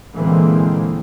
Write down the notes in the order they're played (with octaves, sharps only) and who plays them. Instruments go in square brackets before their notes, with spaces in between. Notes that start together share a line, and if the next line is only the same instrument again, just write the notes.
[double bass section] A#2 D3 E3 G#3 A#3 C4